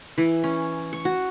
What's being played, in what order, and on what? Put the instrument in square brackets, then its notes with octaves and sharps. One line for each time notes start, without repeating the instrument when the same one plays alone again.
[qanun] E3
C#4
C#6
F#4